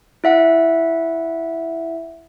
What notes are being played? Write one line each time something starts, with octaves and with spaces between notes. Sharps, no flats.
E4 E5 F#5